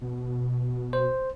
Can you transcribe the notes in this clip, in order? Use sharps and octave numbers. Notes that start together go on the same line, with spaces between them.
B2
C5